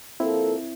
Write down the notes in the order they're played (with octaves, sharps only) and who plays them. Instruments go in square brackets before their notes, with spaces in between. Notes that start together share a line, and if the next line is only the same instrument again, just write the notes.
[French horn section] F3 A#3 F4 A4 [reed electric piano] C4 E4